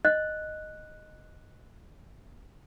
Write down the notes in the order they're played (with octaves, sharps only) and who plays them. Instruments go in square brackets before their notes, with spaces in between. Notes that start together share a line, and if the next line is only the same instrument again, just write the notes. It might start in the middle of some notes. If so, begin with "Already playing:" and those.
[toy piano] D#5 [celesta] F#6